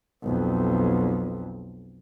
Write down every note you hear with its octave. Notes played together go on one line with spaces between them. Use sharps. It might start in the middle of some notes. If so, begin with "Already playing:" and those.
B1 F2